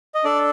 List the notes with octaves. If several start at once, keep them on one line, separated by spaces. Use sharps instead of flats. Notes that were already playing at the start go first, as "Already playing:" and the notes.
D#5
D4 A4 D5